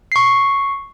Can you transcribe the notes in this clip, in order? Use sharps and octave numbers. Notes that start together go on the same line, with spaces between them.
C#6 C7